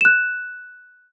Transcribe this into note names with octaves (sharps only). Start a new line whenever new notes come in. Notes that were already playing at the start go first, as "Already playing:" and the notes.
F#6 E7